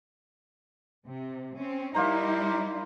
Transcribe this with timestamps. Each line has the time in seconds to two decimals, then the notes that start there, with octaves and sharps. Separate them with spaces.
1.06 C3
1.55 C4 C#4
1.95 G3 A#3 D#4 E4 C5 A#5